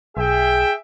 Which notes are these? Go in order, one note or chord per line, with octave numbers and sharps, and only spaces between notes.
B1 G#4 E5 G5